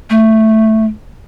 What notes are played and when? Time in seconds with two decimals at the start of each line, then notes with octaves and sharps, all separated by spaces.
0.10 A3